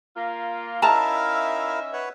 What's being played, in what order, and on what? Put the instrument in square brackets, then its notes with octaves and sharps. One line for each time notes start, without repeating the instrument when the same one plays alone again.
[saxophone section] A#3 F4
[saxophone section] C#4 D#4 E5 [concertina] E4 A#4 F5 [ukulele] A5 A#5
[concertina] B4 C#5 F#5